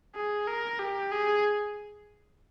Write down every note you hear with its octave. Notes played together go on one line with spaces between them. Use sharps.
G#4
A#4
G4
G#4